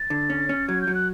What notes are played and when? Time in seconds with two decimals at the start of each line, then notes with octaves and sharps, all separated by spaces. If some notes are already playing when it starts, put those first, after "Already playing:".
Already playing: A6
0.10 D3
0.30 C#4
0.49 C#4
0.68 F#3 G#6
0.81 G6
0.87 F#3
0.94 F#6